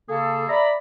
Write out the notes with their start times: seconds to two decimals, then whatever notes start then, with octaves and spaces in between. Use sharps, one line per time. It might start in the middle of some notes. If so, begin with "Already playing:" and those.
0.09 C#3 A#3 G#4 A4
0.49 D5 E5 A#5 B5